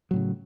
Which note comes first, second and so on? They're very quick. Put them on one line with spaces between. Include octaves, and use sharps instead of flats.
F#3 A2 C#3